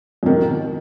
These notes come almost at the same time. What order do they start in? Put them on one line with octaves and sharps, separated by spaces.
F2 D#3 B2